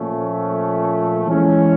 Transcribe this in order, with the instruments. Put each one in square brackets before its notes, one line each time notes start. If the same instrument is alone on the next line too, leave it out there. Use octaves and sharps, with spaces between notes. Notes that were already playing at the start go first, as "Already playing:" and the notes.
Already playing: [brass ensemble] A#2 F3 A3 C#4
E3 G#3 C#4